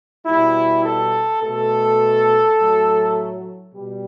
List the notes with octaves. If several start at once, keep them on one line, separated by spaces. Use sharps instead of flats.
B2 G3 E4
A4
B2 A3 A4
A2 F#3 A3
B2 G3